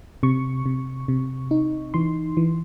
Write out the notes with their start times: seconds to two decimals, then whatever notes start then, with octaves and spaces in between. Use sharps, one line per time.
0.23 C3 C#6
0.66 C3
1.08 C3
1.51 D#4
1.94 E3 C6
2.37 E3